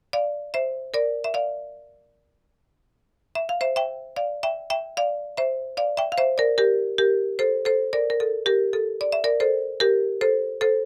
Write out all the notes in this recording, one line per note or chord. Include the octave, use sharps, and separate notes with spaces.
D5 F5
C5 E5
A#4 D5
E5
D5 F5
E5
F5
C5 E5
E5 G5
D5 F5
E5 G5
E5 G5
D5 F5
C5 E5
D5 F5
E5 G5
F5
C5 E5
A#4 D5
G4 A#4
G4 A#4
A4 C5
A4 C5
A#4 D5
A#4
A4
G4 A#4
A4
D5
E5
A#4 D5
A4 C5
G4 A#4
A4 C5
A4 C5